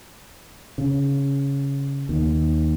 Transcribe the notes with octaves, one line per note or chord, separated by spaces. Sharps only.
C#3
D#2